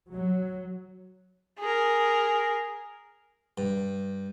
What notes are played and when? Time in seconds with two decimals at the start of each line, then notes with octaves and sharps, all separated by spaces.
0.11 F#3
1.59 G#4 A#4
3.58 G2